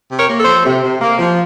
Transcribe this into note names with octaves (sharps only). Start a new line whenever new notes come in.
C3
A#4 C#5
A#3
A4 C5
F3
C3
C3
A#3
F3